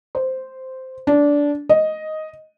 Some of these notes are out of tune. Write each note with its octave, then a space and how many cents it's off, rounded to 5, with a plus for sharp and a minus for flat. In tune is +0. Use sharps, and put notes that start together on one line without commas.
C5 -5
D4 -15
D#5 +5